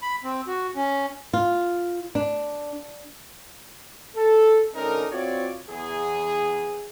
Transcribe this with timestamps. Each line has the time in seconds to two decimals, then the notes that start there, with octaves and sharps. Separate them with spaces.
0.02 B5
0.24 C4
0.48 F#4
0.76 C#4
1.33 F4
2.15 D4
4.16 A4
4.75 D2 D3 C#4 D#4 A#4
5.12 C4 F4 F#4 C#5 D5
5.68 E2 G#4